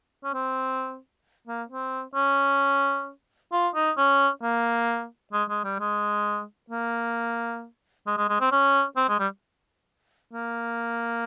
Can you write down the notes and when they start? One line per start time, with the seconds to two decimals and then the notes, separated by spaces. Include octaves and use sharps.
0.24 C#4
0.34 C4
1.47 A#3
1.70 C4
2.15 C#4
3.52 F4
3.75 D#4
3.97 C#4
4.42 A#3
5.33 G#3
5.49 G#3
5.64 G3
5.79 G#3
6.70 A#3
8.07 G#3
8.17 G#3
8.29 G#3
8.41 C4
8.52 C#4
8.97 C4
9.09 G#3
9.19 G3
10.33 A#3